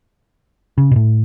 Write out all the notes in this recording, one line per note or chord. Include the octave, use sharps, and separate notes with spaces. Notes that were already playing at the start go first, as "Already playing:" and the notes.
C#3
B2
A2